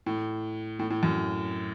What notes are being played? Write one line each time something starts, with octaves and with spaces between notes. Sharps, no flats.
A2
A2
A2
F#2